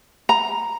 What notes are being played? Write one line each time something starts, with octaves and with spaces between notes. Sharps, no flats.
A#5